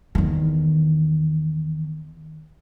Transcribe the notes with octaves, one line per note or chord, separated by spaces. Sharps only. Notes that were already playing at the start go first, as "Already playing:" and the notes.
E2 D#3